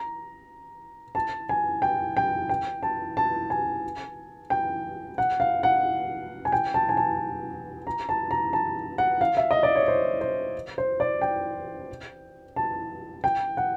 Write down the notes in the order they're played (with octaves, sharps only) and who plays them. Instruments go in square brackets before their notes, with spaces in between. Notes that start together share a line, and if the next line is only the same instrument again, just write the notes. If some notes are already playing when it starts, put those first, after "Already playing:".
Already playing: [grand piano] A#5
A5
G#5
G5
G5
G5
A5
A5
G#5
G5
F#5
F5
F#5
G#5
G5
A5
G#5
A5
A#5
A5
A#5
A5
F#5
F5
E5
D#5
D5
C#5
C5
C5
C5
D5
G5
A5
G5
F#5